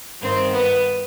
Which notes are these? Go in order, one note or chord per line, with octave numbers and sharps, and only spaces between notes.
G2 D#3 C4
B3